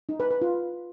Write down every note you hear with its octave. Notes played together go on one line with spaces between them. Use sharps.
D#4
B4
B4
F4